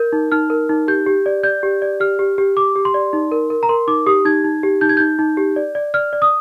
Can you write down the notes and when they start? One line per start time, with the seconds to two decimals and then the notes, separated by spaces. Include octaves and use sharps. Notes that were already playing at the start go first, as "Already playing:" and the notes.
Already playing: A#4 G6
0.13 D#4
0.32 D#4 F6
0.50 A#4
0.69 D#4
0.88 G4 G6
1.07 G4
1.26 D5
1.43 D5 G6
1.63 G4
1.82 D5
2.00 G4 F6
2.19 G4
2.38 G4
2.57 G4 D6
2.75 G4
2.85 C6
2.94 D5
3.13 D#4
3.32 A#4
3.50 A#4
3.63 A#5
3.69 A#4 C6
3.88 D#4 D6
4.06 G4 D#6
4.25 D#4 G#6
4.44 D#4
4.63 G4
4.81 D#4 G6
4.89 G#6
4.97 D#4 G6
5.19 D#4
5.37 G4
5.56 D5
5.75 D5
5.94 D5 F6
6.13 D5
6.22 D#6